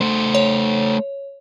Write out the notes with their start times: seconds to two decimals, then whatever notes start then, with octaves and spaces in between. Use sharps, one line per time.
0.01 A3 C5
0.35 C#5